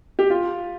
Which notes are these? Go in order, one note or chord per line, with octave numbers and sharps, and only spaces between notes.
G4
F4